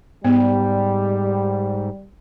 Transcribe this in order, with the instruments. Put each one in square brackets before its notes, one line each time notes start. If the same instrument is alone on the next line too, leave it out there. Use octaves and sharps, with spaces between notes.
[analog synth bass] G#2 [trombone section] G3 [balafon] B3